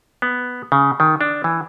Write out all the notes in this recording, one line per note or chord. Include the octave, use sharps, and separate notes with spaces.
B3
C#3
D#3
D4
E3